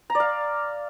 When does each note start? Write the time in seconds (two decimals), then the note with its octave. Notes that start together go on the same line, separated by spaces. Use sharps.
0.10 A#5
0.15 D5
0.20 F5